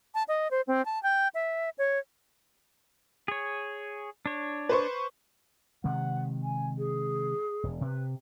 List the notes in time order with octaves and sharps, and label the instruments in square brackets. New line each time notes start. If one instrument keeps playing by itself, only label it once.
[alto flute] A5
D#5
C5
C4
A5
G5
E5
C#5
[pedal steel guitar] G#4 C#5
D4 C#5
[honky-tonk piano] B4 C5 C#6
[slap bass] C3 D#3 G#3 [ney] F#5
[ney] G#5
G#4
[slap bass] E1
[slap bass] C3 [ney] B4